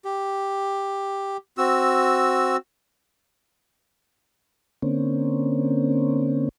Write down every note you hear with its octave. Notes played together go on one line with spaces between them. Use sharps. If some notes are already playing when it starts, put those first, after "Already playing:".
G4
C4 F#4 E6
D3 A#3 C4 C#4